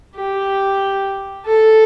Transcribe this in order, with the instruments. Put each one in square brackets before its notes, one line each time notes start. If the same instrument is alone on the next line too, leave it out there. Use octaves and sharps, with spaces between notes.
[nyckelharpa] G4
A4